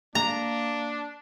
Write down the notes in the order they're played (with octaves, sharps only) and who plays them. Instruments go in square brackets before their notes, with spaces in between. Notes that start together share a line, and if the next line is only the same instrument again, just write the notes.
[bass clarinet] A#3 [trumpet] D4 [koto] A#5